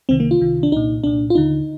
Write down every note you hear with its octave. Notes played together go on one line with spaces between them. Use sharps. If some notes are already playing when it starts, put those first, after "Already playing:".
C2 C3 D#3 C4
A#3
F4
C2 C3 D#3
D4
C2 A#2 D#4
C2 A#2 D4
F4
D#2 D3 D#4